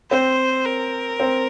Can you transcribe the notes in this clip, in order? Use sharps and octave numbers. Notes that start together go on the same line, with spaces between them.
C4 C5
A#4
C4